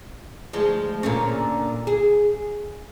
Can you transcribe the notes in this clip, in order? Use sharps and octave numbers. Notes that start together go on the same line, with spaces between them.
D2 F3 G#3
A#2 D3 C#4
G#4